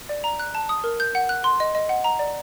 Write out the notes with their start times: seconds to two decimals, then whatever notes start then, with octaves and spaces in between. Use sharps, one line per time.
0.09 D5
0.24 A#5
0.39 F#6
0.55 A5
0.69 D#6
0.84 A#4
1.00 G6
1.15 F#5
1.29 F#6
1.44 C6
1.60 D#5
1.75 D#5
1.89 F#5
2.04 A#5
2.19 D5